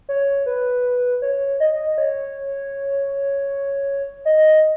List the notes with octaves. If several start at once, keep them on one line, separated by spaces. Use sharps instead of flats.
C#5
B4
C#5
D#5
D#5
C#5
D#5